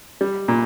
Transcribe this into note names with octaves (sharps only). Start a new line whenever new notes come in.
G3
A#2